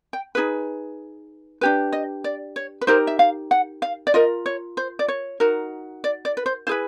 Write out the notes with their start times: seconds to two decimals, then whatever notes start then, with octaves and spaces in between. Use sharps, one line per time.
0.13 G5
0.35 D#4 G#4 B4
1.61 D4 G4 B4
1.93 D#5
2.24 D5
2.56 C#5
2.81 B4
2.87 D#4 G4 A#4 C5
3.07 E5
3.19 F5
3.51 F#5
3.82 F5
4.07 D5
4.14 F4 A#4 D#5
4.46 C#5
4.77 C5
4.99 D5
5.08 C#5
5.40 D#4 F#4 A#4
6.04 D5
6.25 D5
6.37 B4
6.46 C5
6.67 E4 G#4 B4 C5